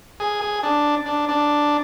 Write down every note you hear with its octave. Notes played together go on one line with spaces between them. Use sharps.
G#4
G#4
D4
D4
D4